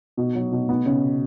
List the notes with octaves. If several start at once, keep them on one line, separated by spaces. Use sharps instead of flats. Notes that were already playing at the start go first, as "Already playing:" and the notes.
B2
F#3
B2
B3
C#3